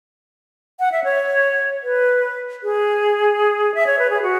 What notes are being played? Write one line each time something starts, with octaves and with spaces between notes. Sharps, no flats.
F#5
E5
C#5
B4
G#4
E5
C#5
B4
G#4
F#4